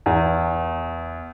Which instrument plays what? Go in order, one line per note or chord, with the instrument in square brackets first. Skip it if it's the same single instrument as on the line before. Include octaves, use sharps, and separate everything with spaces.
[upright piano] E2